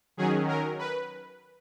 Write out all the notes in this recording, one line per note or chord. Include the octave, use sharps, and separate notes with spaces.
D#3 F#3 C#4 G#4
A#4
B4